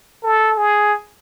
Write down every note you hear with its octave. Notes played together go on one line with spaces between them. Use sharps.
A4
G#4